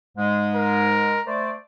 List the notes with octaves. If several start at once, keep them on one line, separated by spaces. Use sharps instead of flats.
G#2 G#3
A#4
A3 C5 D5